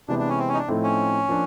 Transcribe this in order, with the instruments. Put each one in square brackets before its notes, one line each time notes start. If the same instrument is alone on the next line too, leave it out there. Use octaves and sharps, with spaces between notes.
[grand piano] C3 E3 G#3 B3 [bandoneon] D4
[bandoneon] D4
C#4
C4
C#4
D#4
D4
[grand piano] A2 F3 A3 C4 D#4
[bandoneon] C#4
[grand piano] F3 A#3 D4